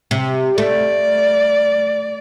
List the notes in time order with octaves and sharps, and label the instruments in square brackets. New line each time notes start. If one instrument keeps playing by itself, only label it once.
[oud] C3
[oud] A3 [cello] D5